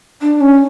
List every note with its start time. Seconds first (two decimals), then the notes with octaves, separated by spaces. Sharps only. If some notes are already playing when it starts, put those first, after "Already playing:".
0.22 D4
0.41 C#4